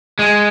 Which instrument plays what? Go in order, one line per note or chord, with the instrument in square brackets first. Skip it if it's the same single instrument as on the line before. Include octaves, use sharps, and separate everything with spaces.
[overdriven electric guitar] G#3